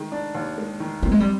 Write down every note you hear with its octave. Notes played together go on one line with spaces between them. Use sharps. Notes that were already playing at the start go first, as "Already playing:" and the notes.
Already playing: D#3 G#3
D4
D#2
G#3
D#3
A#3 C4
G#3
G3